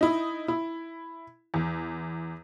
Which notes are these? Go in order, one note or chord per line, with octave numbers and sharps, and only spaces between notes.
D#4 E4
E4
E2